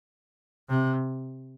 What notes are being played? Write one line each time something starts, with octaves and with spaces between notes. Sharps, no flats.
C3